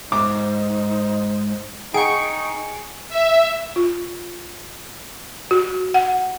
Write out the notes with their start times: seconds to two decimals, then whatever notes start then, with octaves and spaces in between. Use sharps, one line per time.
0.12 G#2 D#4 C5 D6
1.94 D#4 G#4 F#5 G5 C#6 D7
3.09 E5
3.76 F4
5.51 F#4
5.94 F#5